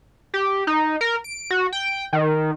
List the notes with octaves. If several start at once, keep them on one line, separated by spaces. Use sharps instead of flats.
G4
D#4
A#4
D7
F#4
G5
D#3